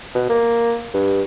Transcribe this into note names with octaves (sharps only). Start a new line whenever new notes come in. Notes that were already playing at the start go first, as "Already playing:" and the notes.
B2
A#3
G2